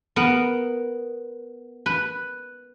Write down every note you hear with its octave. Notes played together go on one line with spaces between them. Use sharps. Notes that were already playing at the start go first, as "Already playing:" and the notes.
B3 A#4
B4